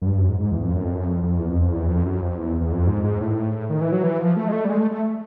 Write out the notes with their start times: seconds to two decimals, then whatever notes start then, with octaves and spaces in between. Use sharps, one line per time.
0.02 F#2
0.06 G2
0.18 F#2
0.29 G#2
0.40 G#2
0.51 E2
0.63 F2
0.75 F#2
0.84 F2
0.95 F#2
1.06 F2
1.23 F2
1.39 E2
1.50 F2
1.61 F2
1.72 E2
1.88 F2
2.05 F#2
2.22 F2
2.38 E2
2.61 E2
2.72 F2
2.87 G#2
3.04 G#2
3.21 A2
3.70 D#3
3.81 E3
3.92 F#3
4.03 E3
4.20 F3
4.37 A3
4.48 G#3
4.53 A3
4.65 G3
4.70 G#3
4.80 A3
4.91 A3